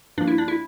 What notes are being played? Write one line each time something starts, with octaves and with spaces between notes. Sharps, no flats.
G2 F3 A#3 D4
E4
D4
E4